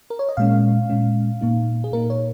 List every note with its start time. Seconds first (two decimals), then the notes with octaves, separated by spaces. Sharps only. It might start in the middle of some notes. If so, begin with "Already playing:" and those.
0.10 A#4
0.19 C#5
0.29 D#5
0.37 A#2 G#3 C#4 F5
0.89 A#2 G#3 C#4
1.41 A#2 A#3 D#4
1.84 G#4
1.93 A#2 A#3 D#4 A#4
2.10 C#5